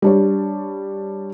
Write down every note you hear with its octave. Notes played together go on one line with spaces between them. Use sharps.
G3 D4 C#5